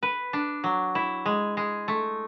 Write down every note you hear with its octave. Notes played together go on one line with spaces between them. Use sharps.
B4
D4
F#3
E4
G#3
G#3
A3